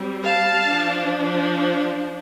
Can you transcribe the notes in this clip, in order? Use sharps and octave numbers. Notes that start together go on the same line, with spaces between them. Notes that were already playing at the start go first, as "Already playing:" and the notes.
Already playing: G3 C4
F5 A5
F3 D4